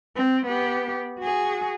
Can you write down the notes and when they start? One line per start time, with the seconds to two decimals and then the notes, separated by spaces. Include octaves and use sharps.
0.16 C4
0.46 B3 G4
1.19 F#4 G#4